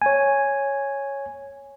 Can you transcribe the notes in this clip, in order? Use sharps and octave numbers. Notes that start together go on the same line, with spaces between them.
C#5 G#5